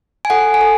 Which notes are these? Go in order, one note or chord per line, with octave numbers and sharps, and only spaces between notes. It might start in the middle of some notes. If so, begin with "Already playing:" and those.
G#5
A4 F#5
G#5
A4